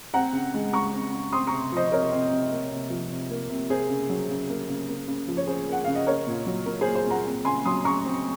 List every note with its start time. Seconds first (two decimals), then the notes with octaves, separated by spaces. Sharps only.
0.14 C4 F#5 A#5
0.33 C#3
0.54 G#3
0.73 C#3 A#5 C#6
0.92 C4
1.13 C#3
1.32 C4 C6 D#6
1.47 A#5 C#6
1.53 C3
1.72 F3 C5 D#5
1.92 C3 A#4 C#5
2.12 C4
2.31 C3
2.51 A#3
2.71 C3
2.90 F3
3.10 C3
3.30 A#3
3.49 C3
3.70 A#3 G#4 C5
3.90 C#3
4.09 F#3
4.29 C#3
4.49 A#3
4.69 C#3
4.89 A#3
5.08 C#3
5.28 F3
5.37 C#5
5.47 C#3 G#4 C5
5.68 A#3 F#5
5.84 C#3 F5
5.95 D#5
6.06 A#3 A#4 C#5
6.27 A#2
6.46 F#3
6.66 A#2 A#4
6.81 A#3 G#4 C5
6.95 G#4 C5
7.06 A#2 F#5 A#5
7.26 C4
7.45 C#3 G#5 C6
7.65 F#3 C6 D#6
7.84 C#3 A#5 C#6
8.05 C4